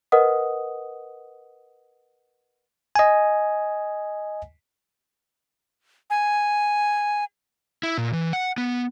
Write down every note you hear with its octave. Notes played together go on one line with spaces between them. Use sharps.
A#4 B4 D#5 F#5 D#6
D#5 G#5
G#5
E4
A#2
E3
F#5
B3